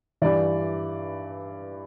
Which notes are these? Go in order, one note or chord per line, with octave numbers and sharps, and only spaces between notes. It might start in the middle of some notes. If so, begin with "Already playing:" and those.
G2 E3 D5